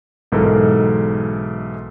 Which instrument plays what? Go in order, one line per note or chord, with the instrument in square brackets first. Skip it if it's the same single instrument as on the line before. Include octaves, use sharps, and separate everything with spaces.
[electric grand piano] B1 G#2 E3 A4 A#4 A#5